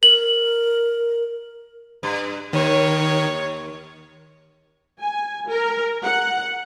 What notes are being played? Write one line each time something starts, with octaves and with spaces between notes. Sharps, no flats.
A#4 F#7
G2
D#2 D#3 C#5
G#5
A#4
F#5